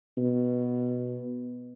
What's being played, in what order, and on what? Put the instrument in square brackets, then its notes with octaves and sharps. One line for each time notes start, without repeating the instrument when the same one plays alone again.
[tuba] B2